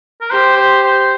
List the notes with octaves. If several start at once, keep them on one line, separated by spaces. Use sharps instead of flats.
A#4
G4 C5
C5
C5